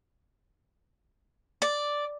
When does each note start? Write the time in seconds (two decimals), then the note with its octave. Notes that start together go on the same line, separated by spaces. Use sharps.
1.62 D5